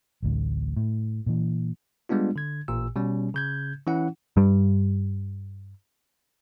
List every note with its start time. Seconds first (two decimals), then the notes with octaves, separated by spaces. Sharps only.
0.23 A1 D2 A2
0.76 A2
1.26 A#2 E3
2.09 G3 G#3 B3 D4 F4
2.36 D3 G#6
2.68 A1 A#2 E6
2.96 B2 G3 C#4
3.34 C#3 G6 G#6
3.87 E3 C#4 E4 F#5
4.37 G2 G3